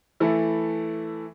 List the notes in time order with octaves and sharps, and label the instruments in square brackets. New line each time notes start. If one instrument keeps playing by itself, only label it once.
[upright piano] E3 A3 E4 A4